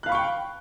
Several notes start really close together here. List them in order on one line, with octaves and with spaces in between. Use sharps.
F#6 F5 B5 C#6 G5